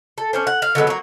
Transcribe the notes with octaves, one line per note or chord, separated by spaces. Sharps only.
A4
C#4 D4 C5
F#5
F5
D3 F#3 G#3 B3
F#3 A#3